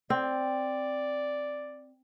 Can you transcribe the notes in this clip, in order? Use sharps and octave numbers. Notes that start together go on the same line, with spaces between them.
C4 D5